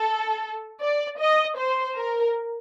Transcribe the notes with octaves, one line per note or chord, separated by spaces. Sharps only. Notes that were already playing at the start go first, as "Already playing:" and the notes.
Already playing: A4
D5
D#5
C5
A#4